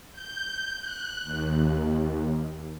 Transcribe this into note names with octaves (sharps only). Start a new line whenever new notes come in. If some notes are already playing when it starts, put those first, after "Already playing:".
G6
F#6
D#2